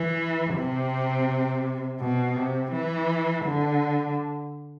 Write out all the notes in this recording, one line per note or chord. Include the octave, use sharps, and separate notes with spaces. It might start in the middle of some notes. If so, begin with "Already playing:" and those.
Already playing: E3
C3
B2
C3
E3
D3